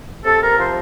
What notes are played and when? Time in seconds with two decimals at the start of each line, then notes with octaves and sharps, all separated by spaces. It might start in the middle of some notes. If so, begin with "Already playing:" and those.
0.25 C3 A4
0.42 A#4
0.59 F3 C5